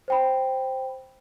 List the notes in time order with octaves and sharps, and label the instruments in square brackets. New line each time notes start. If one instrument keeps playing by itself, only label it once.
[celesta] C5 G5 B5